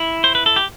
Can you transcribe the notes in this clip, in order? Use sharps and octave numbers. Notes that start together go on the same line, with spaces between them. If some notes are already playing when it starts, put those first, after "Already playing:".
Already playing: E4
C5
B4
A4
G4